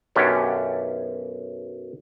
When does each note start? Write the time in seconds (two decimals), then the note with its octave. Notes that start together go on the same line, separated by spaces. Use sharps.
0.15 B1 F#2 C#4 D4 G4 C#5